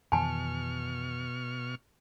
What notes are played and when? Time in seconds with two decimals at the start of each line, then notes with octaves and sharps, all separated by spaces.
0.12 F2 B2 D#3 E3 G#5 A5 C#6 F6